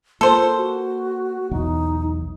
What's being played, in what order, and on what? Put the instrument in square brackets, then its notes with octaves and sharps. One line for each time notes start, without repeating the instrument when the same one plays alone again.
[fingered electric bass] A#3 [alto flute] F4 [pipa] A4 C5
[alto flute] F#4
[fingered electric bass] B1 E2 [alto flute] D#4